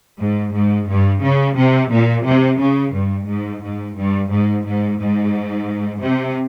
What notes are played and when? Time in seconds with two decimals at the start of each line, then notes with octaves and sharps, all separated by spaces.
0.19 G#2
0.53 G#2
0.88 G2
1.22 C#3
1.56 C3
1.91 A#2
2.26 C3
2.59 C#3
2.93 G2
3.28 G#2
3.62 G#2
3.96 G2
4.31 G#2
4.65 G#2
4.99 G#2
6.02 C3